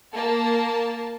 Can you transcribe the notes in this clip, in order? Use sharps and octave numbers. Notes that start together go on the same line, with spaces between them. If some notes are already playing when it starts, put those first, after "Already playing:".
A#3 A5